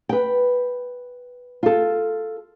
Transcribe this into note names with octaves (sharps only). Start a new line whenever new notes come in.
B4 G5
F4 A4